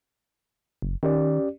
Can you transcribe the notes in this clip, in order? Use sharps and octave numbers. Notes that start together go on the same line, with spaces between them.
F#1
D#3 C#4 G4 D5